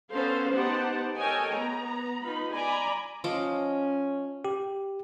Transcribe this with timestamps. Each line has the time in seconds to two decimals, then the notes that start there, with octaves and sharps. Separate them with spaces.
0.12 B3 C#4 A4 C5 F5 C6
0.53 B3 D#4 G4 C5 F#5 A5
1.17 A4 A#4 C#5 D#5 G5 G#5
1.53 B3 A#5
2.23 B3 D#4 F4 B5
2.53 D5 G#5 A#5 B5
3.24 F3 C#4 D#5 D6
4.45 G4